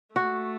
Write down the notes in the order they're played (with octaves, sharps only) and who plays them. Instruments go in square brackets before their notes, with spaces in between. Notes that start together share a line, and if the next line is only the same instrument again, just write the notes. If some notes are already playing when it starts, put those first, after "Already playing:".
[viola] A3 [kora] F#4